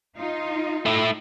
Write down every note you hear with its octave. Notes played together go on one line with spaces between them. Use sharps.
D#4 F4
A3 E4